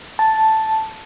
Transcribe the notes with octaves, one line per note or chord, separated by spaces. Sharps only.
A5